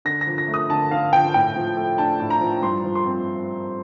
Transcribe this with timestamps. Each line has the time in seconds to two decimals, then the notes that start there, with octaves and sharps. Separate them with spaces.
0.05 D3 A#6
0.21 A#6
0.27 F3
0.38 A#6
0.48 A3
0.54 D#6
0.70 D3 A5
0.91 D3 F5
1.13 F3 G5
1.34 A2 G5
1.56 F3
1.77 A3
1.98 D4 A5
2.20 A2
2.30 A#5
2.41 F3
2.62 G2 C6
2.84 F3
2.95 C6
3.06 C4